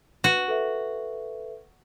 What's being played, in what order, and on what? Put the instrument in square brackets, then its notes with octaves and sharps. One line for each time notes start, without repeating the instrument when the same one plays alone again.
[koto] F#4 [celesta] B4
[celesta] A4 B4 E5